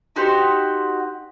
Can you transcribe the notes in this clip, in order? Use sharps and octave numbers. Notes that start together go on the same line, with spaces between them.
D#4 F#4 G4 C5